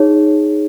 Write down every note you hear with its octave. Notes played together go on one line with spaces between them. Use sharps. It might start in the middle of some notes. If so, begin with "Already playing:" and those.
Already playing: D#4 G#4 C#5